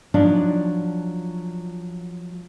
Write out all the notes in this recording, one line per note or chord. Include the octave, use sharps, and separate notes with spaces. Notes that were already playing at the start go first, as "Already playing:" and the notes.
F3 F#3 D4 D#4 F4